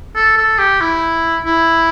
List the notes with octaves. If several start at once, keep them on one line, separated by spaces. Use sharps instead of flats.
A4
A4
G4
E4
E4